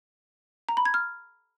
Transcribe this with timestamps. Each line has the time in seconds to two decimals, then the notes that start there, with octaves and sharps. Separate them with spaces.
0.69 A#5
0.77 B5
0.85 G#6
0.94 F6